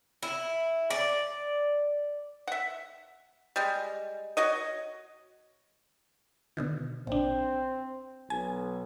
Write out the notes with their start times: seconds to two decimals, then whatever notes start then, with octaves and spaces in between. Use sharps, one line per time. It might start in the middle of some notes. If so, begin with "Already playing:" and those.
0.22 E4
0.90 D5
2.47 E5 F#5
3.56 G3 G#3
4.37 F#4 C#5 D#5
6.57 B2 D3 D#3
7.07 A#1 C4 D4
8.30 B1 G#5